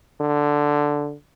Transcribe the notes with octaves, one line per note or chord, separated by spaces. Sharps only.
D3